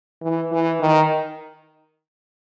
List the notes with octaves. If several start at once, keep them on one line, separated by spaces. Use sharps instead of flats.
E3
E3
D#3